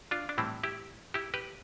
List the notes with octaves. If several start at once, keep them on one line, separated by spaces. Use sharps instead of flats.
D4 F4
D4
A2 E3 G3 C4 E4
E4 G4
E4 G4
G4 B4